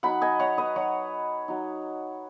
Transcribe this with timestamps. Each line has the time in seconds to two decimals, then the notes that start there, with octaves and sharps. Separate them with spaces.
0.03 F#3 D#4 F#5 B5
0.21 D#5 G#5
0.39 C#5 F#5
0.58 B4 D#5
0.76 F#3 D#4 C#5 F#5
1.48 F#3 D#4